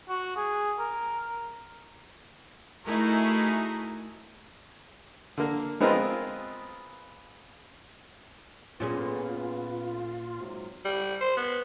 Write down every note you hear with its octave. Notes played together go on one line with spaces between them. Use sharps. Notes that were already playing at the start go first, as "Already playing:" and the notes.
F#4
G#4
A#4
A3 D#4 E4 F#4 G#4 A#4
D3 A#3
G#3 B3 C4 F4 A#4 D#5
A#2 B3 C#4 F4 G#4 A4 B4
G#2 C3 F#3
G3
C5
B3